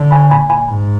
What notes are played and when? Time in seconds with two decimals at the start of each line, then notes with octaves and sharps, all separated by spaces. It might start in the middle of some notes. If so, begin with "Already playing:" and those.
Already playing: D3
0.11 G#5 B5
0.31 A#2 G#5 B5
0.50 G#5 B5
0.69 G#2